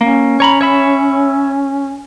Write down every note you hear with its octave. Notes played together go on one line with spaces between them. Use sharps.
A#3 C#4
C#5 A#5 B5
C#5 E5 B5